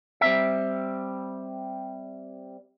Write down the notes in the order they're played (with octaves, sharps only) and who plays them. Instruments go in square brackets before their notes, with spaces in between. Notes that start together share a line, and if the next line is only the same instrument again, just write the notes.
[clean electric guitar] G3 C4 E5